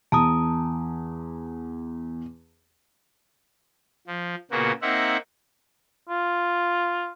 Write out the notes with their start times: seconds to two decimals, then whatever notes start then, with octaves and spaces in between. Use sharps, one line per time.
0.12 E2 A5 A#5 D#6
4.07 F3
4.51 A#2 C#3 A#3 B3 F#4
4.82 A#3 C4 D#4 E5 F#5
6.09 F4